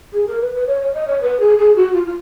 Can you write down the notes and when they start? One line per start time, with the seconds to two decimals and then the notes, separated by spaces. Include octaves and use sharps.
0.13 G#4
0.28 A#4
0.41 B4
0.54 B4
0.67 C#5
0.81 C#5
0.94 D#5
1.08 C#5
1.22 B4
1.40 G#4
1.58 G#4
1.76 F#4
1.94 F4
2.06 F4